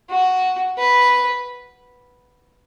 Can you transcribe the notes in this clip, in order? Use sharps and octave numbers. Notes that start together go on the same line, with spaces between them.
F#4
B4